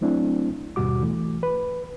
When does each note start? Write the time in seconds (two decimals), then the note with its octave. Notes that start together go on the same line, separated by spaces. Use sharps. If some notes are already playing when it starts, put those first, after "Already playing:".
0.01 F#3 A3 C4 D4 E4
0.76 D#2 G#2 B2 G3 F#4 D6
1.02 E3 A3
1.43 B4